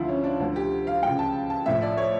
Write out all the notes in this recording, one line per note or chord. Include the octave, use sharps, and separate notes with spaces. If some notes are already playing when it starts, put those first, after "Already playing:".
Already playing: D2 D3 F3 E4 F4
C#4
D4
D2 D3 F3
G4
F5
C#2 C#3 F3 G5
A5
A5
A#1 A2 F3 E5
D5
C#5